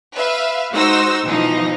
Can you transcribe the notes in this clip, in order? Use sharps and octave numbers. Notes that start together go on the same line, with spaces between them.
B4 E5 F5
G#3 D#4 F#4 C5 E6 A#6
B2 E3 F3 D#4